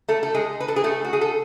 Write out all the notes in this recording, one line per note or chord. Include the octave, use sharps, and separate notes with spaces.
A3 A4
A4
G#3 G#4
B4
A4
G#4
A3 A4
F#4
G#4
A4